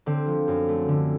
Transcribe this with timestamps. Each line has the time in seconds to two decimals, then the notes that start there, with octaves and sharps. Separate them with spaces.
0.06 D3 C4
0.27 F3
0.48 F#2
0.68 A3
0.88 D3